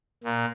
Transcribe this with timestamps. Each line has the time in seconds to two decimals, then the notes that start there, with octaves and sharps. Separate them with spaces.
0.24 A#2